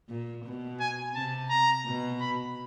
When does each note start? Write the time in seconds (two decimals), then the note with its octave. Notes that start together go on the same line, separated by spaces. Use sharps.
0.09 A#2
0.45 B2
0.80 G#5
1.15 C3 A5
1.50 A#5
1.85 B2
2.21 B5